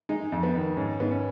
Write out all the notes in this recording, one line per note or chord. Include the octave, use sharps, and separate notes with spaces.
G#3 D#4
F2
B3
D#3
G#2 C#4
G#2 B3
C#4